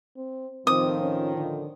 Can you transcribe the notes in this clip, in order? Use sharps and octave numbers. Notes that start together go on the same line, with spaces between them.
C4
A2 D#3 F3 C4 D#6
C#4
D3